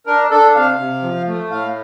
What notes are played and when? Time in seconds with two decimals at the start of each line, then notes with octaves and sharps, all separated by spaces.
0.06 D4 A#4
0.31 D4 A4
0.55 C3 F5
0.79 C3
1.03 F3
1.27 A3
1.50 A2 F5